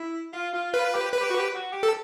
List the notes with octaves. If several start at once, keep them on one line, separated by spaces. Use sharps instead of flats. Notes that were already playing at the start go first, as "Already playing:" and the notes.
Already playing: E4
F4
F4
F4 B4
G4
B4
G4
F#4
G4
F#4
G4
A4